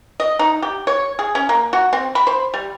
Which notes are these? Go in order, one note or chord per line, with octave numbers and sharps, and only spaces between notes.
D#5
D#4
G4
C#5
G#4
C#4
A#3
F#4
C4
B5
C5
G3